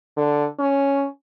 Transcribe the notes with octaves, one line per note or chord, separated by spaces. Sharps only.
D3
C#4